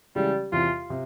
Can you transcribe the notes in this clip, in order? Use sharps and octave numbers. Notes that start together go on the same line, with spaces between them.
C#3 E3 G3 G#3
E2 C3 E3 F4
C3